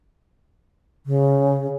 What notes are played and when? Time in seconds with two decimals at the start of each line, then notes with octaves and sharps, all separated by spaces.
1.06 C#3